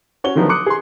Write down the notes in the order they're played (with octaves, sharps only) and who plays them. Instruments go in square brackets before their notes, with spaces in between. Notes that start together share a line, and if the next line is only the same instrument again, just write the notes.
[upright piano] C#4 F#4 C#5 G7
D3 D#3 F3 F#3 A3 B3
C6 D6 D#6 F#6 C#7
G#4 C6